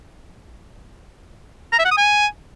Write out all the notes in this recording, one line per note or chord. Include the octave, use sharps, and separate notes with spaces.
A#5
E5
F#5
D#6
G#5